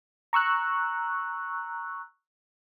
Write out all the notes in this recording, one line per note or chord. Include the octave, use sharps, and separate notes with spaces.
A#5 C#6 E6 F#6